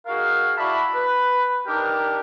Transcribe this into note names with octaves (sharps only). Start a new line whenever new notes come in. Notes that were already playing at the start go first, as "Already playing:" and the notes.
D#4 F#4 G#4 A#4 F5
E4 F#4 D5 E5 A5 B5
B4
D4 D#4 G4 A#4